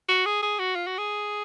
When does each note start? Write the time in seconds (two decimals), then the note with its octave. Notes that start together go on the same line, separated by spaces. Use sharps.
0.09 F#4
0.26 G#4
0.42 G#4
0.59 F#4
0.75 F4
0.87 F#4
0.98 G#4